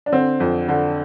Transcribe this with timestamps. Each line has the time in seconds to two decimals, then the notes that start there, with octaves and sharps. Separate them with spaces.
0.06 D4
0.12 D3 C4
0.40 F2
0.68 D3